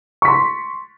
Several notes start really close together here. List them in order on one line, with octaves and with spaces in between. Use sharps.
C#6 B6 C6